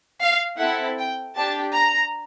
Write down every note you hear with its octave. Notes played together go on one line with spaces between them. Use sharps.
F5
C4 E4 A4 F#5
G5
D4 G4 A5
A#5